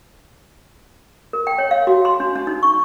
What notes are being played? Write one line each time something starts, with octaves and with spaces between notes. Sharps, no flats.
A#4
G5
C#5
F5
F#4
C6
D4
D4
D#4
C#6